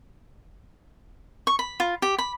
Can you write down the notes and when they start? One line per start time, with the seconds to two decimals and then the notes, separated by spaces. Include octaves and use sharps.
1.47 C#6
1.59 B5
1.80 F4
2.02 G4
2.18 B5